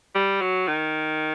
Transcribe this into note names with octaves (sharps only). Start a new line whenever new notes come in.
G3
F#3
D#3